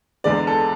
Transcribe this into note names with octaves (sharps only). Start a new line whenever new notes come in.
E2 D3 G#3 D5
A4